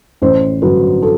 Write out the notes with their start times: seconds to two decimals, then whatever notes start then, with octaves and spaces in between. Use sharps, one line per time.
0.22 A1 C5
0.62 G2 D3 F#3 B4
1.02 A4